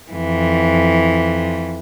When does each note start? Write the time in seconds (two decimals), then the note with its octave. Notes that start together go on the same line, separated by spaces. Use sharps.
0.11 F2 E3